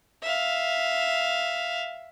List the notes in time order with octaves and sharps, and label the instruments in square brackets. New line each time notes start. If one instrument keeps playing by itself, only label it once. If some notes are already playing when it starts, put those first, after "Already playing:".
[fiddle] E5 F5